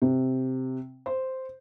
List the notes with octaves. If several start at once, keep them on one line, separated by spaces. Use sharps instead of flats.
C3
C5